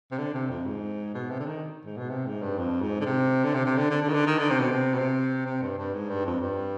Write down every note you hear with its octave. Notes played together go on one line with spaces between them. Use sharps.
C3
D3
C3
F2
G#2
B2
C3
D3
D#3
G#2
B2
C3
G#2
G2
F2
G#2
D3
C3
D3
C3
C3
D3
D3
D3
D#3
D3
D#3
D3
C3
B2
C3
B2
C3
C3
G2
G2
G#2
G2
F2
G2